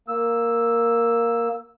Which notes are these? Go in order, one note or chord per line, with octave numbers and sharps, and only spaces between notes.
A#3 E6